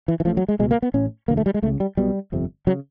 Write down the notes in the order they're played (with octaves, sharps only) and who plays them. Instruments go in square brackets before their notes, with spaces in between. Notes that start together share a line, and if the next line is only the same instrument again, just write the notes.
[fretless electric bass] E3
E3
A1 A2 F3
F#3
G#3
B2 G#3
C#2
A#3
B3
A1 A2 C#4
E1 D2 D3 A#3
A3
G3
G#3
C#2 A3
C#3
G3
B1 B2 G3
G1 F2 C3
C#3 F#3